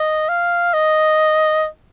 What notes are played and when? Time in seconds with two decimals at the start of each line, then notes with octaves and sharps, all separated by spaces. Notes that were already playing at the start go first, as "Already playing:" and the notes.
Already playing: D#5
0.29 F5
0.73 D#5